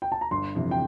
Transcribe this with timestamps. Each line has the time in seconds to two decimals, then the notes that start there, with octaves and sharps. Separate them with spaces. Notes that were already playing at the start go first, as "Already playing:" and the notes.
0.02 G5
0.12 A5
0.21 A#5
0.31 G1 C6
0.55 F2 C3 E3
0.71 G5